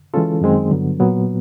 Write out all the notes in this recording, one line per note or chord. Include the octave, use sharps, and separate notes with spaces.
E3 G#3 C#4 F4 A4
F#2 D#3 G#3 C4
G2 D3 F#3 B3
A#2 F#3 B3